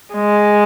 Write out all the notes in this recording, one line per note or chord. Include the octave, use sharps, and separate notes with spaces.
G#3